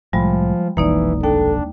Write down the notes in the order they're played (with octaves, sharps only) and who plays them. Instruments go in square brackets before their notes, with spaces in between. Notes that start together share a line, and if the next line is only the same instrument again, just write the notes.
[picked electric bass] C2 A2 [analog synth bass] F3 [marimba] G3 G#3 B5
[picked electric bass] F1 B1 F2 [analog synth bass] E3 [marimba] A#3 D#4 D5
[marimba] D#2 G5 [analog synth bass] D4 [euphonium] A4